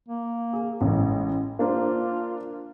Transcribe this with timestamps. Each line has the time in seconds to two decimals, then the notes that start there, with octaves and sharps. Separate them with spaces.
0.09 A#3
0.53 G#4
0.81 A1 G#3
1.59 A#3 D4 F4 C5